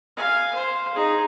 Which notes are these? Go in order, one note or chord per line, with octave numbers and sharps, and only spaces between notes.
F5 G#5
C5
D#4 G#4